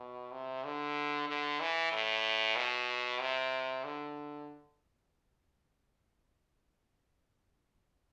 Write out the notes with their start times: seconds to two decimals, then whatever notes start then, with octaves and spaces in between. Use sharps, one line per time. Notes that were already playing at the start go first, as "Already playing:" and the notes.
Already playing: B2
0.32 C3
0.64 D3
1.29 D3
1.60 E3
1.92 A2
2.56 B2
3.20 C3
3.84 D3